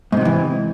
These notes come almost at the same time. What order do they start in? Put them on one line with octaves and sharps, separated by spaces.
G#2 C3 F#3 E3